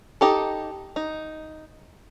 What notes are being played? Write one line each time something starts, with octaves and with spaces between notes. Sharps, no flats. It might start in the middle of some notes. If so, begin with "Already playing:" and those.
D#4 G4 A4
D#4